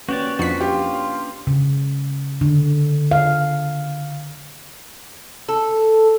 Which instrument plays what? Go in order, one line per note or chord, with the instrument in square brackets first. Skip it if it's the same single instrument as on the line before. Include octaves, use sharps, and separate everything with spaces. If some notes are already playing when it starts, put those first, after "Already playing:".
[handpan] A#3 C#4 B4 [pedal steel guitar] F#4 G4 D5
[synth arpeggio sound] F2 B6 [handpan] D4 [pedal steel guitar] F#4
[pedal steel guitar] F4 [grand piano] G4
[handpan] C#3
D3
F5
[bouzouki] A4